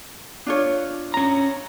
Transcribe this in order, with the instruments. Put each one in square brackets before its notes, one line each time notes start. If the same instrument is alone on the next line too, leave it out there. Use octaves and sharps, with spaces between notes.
[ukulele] D4 F4 C#5
[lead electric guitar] C#4 A#5